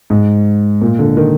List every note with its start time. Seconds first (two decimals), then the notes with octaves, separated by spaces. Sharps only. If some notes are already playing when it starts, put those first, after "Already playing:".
0.10 G#2
0.82 A#2
0.99 D3
1.17 D#3